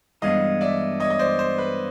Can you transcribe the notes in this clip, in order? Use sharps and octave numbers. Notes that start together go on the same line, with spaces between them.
G2 E3 G#3 B3 D4 D#5 F5
D5 E5
C#5 D#5
D#5
C5 D5
C5
B4